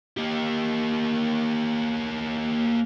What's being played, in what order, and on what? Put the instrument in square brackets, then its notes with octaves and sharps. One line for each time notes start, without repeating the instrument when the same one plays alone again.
[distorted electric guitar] A#3 G4